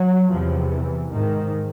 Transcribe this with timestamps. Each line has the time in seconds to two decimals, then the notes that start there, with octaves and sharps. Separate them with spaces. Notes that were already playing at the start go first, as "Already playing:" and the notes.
Already playing: F#3
0.31 E2 C3 F3
0.71 E3
1.11 G#2 D#3